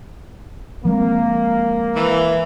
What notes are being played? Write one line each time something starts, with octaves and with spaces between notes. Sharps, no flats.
F3 G#3 A#3 C4
E3